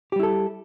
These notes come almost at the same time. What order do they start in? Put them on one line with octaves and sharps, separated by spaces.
G4 G3 E4 A4